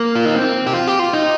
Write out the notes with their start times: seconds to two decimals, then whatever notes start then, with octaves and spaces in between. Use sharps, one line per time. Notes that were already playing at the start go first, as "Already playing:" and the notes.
Already playing: A#3
0.15 F4
0.25 D#4
0.35 C4
0.67 G4
0.74 F4
0.88 G4
0.99 F4
1.14 D#4